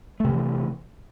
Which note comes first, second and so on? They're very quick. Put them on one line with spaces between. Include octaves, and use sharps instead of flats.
A3 C3 D#3 E3